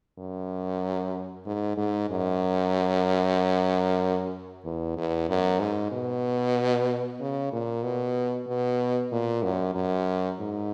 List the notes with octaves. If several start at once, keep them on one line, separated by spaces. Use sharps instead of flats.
F#2
G#2
G#2
F#2
E2
E2
F#2
G#2
B2
C#3
A#2
B2
B2
A#2
F#2
F#2
G#2